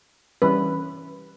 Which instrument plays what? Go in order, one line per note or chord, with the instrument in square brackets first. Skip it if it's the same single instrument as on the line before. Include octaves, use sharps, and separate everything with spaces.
[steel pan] E3 G3 C#4 B4